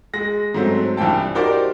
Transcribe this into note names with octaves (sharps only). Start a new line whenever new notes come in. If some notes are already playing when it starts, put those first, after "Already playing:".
G#3 A#6
G#2 F#3 A3 C4
C2 G2 E3 E4 G5 A5
D#4 F#4 G4 A#4 C5 D5